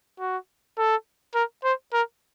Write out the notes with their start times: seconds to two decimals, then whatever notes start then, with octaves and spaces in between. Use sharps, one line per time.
0.20 F#4
0.78 A4
1.35 A#4
1.64 C5
1.93 A#4